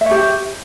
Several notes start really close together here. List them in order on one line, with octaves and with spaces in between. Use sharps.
E5 C#5 G4